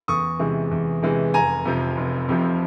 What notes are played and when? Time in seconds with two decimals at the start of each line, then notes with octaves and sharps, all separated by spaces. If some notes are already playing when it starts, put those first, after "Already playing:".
0.08 E2 C#6 D#6
0.39 C3 E3 G#3
0.71 E2
1.03 C3 E3 G#3
1.34 F1 G#5 A#5
1.65 F2 C3 F3
1.97 F1
2.29 F2 C3 F3